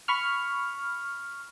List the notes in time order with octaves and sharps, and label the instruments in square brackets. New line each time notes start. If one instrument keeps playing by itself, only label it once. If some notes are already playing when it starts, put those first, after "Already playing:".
[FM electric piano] B5 C#6 F6